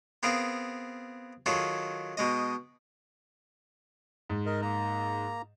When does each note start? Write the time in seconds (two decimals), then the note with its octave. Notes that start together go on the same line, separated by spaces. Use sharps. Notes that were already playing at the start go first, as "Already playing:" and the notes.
0.23 B3 C4 G#4 A#4 F5
1.46 D#3 F#3 F4 G#4 A4
2.17 B2 G#3 D#5
4.30 G#2
4.46 A#4 D#5
4.62 A#3 A#5